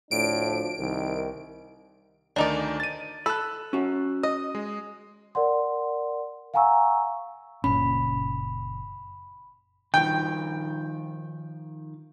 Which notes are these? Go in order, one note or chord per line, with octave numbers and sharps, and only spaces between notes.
D2 A2 F3 D4 D7
C2 D#3
D2 D#3 D4 D#4 D5
A6 D#7
A4 B5 E6 F#6
C#4 F#4
D#5 D#6
G#3
A#4 D5 F#5 C6
F5 F#5 G#5 A#5 C#6 E6
F#1 A#2 C#4 B5
D#3 F3 G5